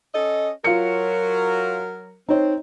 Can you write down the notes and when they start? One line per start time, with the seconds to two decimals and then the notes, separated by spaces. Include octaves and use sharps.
0.14 C#4 A4 D#5
0.64 F#3 F4 A#4 C#7
2.28 C4 D#4 C#5